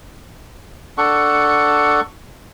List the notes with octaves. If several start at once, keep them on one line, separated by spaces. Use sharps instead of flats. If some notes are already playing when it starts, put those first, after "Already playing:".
D4 A4 F#5 C#6